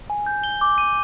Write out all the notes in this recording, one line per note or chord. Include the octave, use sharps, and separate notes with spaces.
G#5
G6
G7
D6
D#7